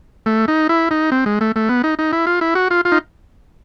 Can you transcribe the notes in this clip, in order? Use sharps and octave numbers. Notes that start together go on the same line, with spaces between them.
A3
D#4
E4
D#4
C4
G#3
A3
A3
B3
D#4
D#4
E4
F4
E4
F#4
F4
F4
D#4